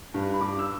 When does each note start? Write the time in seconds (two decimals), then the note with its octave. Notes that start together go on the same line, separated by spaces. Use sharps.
0.14 G2
0.34 B5
0.41 G2 D6
0.59 E6